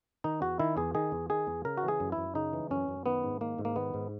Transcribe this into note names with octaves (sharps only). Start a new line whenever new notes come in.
D#3 D#4
E2 F#4
D#3 E4
E2 G#4
D#3 G#4
E2
D#3 G#4
E2
C#3 A#4
F#4
E3
G#4
F#2
E4
F#2
C#3 D#4
E3
F#2 C#4
F#2
D#3 B3
G#2
D#3 A#3
G#2
A#3
D#3 B3
G#2